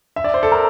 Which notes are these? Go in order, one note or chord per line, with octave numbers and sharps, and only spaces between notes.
E5
D5
C5
A4
A#4